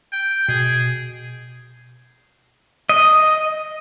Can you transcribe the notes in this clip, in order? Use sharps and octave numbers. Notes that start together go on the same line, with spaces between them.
G5
B2 G#4
D#5